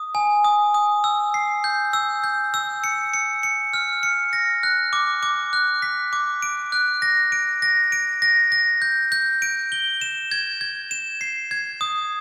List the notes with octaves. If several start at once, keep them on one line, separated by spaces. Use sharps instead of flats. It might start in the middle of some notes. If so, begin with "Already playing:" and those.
Already playing: D#6
G#5
D#6
D#6
E6
C7
G6
E6
G6
E6
C#7
C#7
C#7
F6
C#7
A#6
F#6
D6
D6
F#6
B6
D6
D7
F#6
A#6
D7
A#6
D7
A#6
A#6
G6
G6
D7
G7
E7
G#6
G#6
E7
C7
G#6
D#6